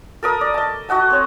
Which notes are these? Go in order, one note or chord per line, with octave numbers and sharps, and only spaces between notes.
A4 A#4 D#6
D5
D#5 A5
F#4 D#5 F#5 A5
C4 C#5